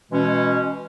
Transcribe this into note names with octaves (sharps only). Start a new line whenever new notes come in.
B2 E3 G#3 C#4